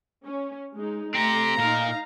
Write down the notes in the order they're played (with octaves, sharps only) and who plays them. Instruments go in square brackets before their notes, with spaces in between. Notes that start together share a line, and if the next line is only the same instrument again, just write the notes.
[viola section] C#4
G#3 D#4
[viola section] A3 [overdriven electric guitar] C4 G4 [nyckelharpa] A#5
[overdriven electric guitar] A#2 A#4 [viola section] D#4 F5